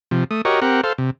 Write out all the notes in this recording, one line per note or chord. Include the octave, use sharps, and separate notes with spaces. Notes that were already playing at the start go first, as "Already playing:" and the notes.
C3 F3
A3 D#6
F#4 G4 A#4 C#5 D#5
C4 G4 A#4 F#5
A4 C5 F5
C3